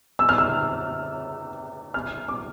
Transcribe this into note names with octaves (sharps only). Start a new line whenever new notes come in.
E6
F6
E6
F6
D6